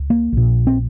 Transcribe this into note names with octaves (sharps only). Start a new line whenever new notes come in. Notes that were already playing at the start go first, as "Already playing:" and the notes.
Already playing: C#2
A#3
A#1 A#2
C4